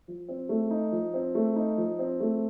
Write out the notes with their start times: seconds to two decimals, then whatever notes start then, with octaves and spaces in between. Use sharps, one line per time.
0.08 F3
0.29 C4
0.49 A3
0.71 D#4
0.92 F3
1.14 C4
1.35 A3
1.56 D#4
1.77 F3
1.99 C4
2.20 A3